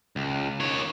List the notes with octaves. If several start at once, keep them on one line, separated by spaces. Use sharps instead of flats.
C#2
D#3 C#5